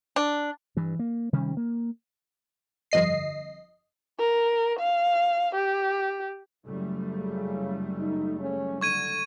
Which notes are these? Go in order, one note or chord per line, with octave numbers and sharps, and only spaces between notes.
D4
G2 E3
A#3
C3 D#3 G3 C#4
A#3
G1 F2 D#5 C7
A#4
F5
G4
F#1 G3 A3
C#3
D#4
C#3 C#4
D3 C#6 G#6 D#7